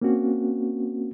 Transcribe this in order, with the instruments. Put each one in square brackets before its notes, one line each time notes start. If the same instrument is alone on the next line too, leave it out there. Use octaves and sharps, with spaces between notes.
[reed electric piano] A#3 C4 C#4 F#4